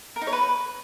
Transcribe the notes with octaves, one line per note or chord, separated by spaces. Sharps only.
A#4
D#4
C#5
B4